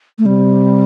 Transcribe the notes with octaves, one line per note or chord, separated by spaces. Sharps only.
A3
C3 G3